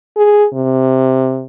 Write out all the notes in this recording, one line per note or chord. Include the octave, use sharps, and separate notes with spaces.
G#4
C3